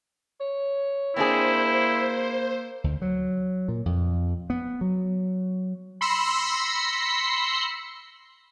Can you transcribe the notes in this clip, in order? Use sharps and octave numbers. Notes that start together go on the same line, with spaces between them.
C#5
A#3 C4 D4 E4 G#4 C5
D2
F#3
A#2
F2
B3
F#3
B5 C6 E6 A#6 C7 C#7